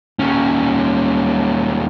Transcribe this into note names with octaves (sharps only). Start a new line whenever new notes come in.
D#2 C#4